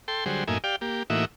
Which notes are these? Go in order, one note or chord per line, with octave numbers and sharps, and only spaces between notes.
A4 G5 C6
D3 F#3 G3 G#4 C5
F#2 A2 A#3 D#4 E5 G#5
G4 D5 F5 G5
A#3 G4
A2 E3 A#3 D#4 F#4 E5